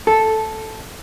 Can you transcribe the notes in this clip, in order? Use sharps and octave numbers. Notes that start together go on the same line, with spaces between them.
A4